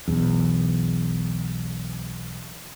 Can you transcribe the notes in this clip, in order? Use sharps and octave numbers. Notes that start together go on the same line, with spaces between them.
B1 E2